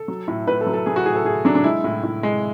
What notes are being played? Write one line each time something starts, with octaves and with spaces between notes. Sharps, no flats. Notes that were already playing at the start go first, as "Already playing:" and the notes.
Already playing: A4
F#3
A2
A2 B4
A4
F#3
A4
F#3 G#4
F#4
A2 G#4
A4
A2 G#4
F#3 D4
D4
G#3 E4
A2
A2
G#3